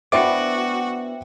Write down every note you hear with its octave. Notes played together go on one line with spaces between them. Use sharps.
B3 D4 E4 F#4 C5 E5 G5 D6